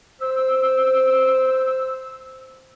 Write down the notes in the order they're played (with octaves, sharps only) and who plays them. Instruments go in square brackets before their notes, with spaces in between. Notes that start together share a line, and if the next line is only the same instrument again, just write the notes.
[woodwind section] C5 E6